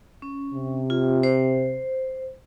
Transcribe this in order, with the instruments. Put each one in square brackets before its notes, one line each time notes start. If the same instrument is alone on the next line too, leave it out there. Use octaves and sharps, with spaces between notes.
[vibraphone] C#4
[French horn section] C3
[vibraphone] F4
C5